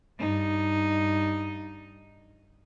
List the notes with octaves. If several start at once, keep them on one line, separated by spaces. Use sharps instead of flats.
G2 D#4